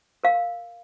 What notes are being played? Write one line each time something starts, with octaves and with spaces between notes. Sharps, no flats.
A#4 F5